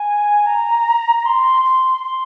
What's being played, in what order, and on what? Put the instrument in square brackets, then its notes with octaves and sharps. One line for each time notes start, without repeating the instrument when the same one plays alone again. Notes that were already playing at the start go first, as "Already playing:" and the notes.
Already playing: [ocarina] G#5
A#5
A#5
C6
C6
C6